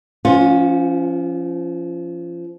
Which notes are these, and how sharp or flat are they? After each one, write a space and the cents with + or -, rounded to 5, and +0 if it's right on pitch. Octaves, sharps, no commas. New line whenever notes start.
F3 -25 C#4 +0 F4 +25